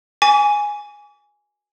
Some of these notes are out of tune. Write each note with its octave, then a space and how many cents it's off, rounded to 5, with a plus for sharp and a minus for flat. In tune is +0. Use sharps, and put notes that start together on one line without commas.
G#5 +0 D6 -40